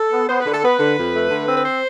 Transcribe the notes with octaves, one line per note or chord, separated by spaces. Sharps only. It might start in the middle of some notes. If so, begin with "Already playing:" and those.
Already playing: A4
B3
B3 C5
B4
D3
A4
B3 B4
D3
F2
A3
D3
C4
B4
C5